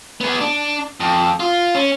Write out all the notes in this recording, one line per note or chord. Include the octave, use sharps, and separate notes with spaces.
B3 G#4
D4
F2
F4
C#4